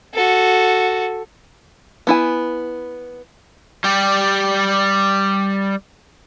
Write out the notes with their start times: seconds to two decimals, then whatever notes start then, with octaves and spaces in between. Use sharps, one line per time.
0.14 F#4 A4
2.07 B3 E4 G#5
3.84 G3 G4